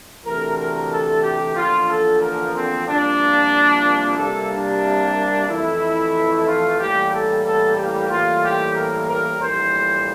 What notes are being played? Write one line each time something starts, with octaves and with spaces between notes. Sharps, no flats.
D2 C3 E3 A3 A#4
A#4
A4
G4
E2 D3 F3 A#3 F4
A4
A#4
C4
C2 A#2 F3 A#3 D4
C2 C3 G3 A#3 A4
D4
F2 E3 A3 E4
F4
A1 A2 E3 G3 A#3 G4
A4
A4
G4
A2 E3 G3 A#3 F4
G4
A#4
A#4
A#1 A2 E3 G3 A#3 C5